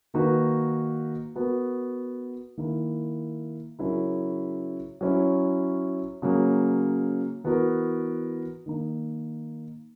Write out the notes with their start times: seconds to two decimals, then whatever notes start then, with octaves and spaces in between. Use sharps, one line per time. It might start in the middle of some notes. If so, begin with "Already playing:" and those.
0.14 D#3 A#3 D#4 F#4 B4
1.35 B3 F#4 A#4
2.57 D#3 A#3 E4 A#4
3.79 C#3 F#3 C#4 E4 A#4
5.01 F#3 C#4 E4
6.22 C#3 F#3 A#3
7.44 E3 B3 F#4 A#4
8.66 D#3 A#3 D#4